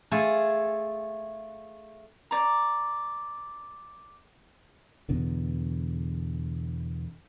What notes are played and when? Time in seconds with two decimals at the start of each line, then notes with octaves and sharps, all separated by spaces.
0.11 A3 F4 G#4 A4 G#5
2.31 D5 A#5
5.09 E2 B2 D3